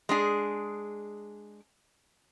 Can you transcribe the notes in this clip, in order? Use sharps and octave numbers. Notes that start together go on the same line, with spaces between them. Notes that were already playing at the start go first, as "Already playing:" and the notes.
G#3 D4 G#4